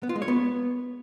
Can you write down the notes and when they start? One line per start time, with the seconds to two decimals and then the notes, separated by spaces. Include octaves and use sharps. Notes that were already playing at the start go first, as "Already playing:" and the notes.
0.03 B3
0.09 F4
0.16 G#3
0.22 C#5
0.28 B3